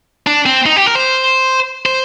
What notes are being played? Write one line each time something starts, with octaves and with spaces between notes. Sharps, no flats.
D4
C4
D#4
G4
A#4
C5
C5